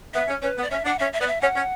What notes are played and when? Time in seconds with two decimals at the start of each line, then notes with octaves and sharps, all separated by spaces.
0.14 B3 E5
0.28 C#4
0.42 C#4 B4
0.56 B3
0.62 D5
0.70 C#4 E5
0.84 D4 F#5
0.99 C#4 E5
1.13 E5
1.20 B3 D5
1.27 E5
1.41 C#4 F#5
1.55 C#4